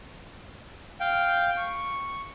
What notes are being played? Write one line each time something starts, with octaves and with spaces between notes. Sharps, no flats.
F5 G5
C#6